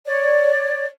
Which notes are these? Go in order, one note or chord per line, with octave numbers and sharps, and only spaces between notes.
C#5 D5